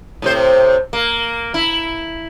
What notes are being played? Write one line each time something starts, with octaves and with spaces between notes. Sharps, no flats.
A2 C3 C5
A#3
E4